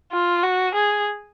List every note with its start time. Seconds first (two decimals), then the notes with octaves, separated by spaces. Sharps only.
0.12 F4
0.43 F#4
0.74 G#4